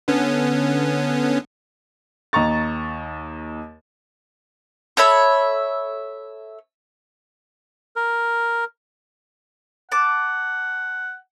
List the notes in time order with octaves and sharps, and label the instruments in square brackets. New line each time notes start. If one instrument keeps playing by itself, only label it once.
[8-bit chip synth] D3 B3 C#4
[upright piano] D#2 D#5 A#5 C#6 A6
[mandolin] A4 C#5 E5 B5
[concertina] A#4
[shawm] F#5 [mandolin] A5 D6